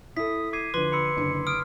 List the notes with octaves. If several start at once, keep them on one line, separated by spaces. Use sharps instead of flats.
E4 A4 D#6 B6
D6 G#6 C7 D#7
D3 F3 B4 C6
B5 C6 E6 C#7
F#1 D3 D4
D#6 F6 D7